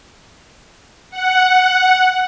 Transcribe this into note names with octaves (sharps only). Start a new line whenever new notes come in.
F#5